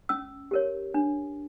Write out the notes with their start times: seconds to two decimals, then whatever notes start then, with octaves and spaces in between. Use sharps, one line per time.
0.09 C#4 E6
0.51 G4 A#4 C#5
0.94 D4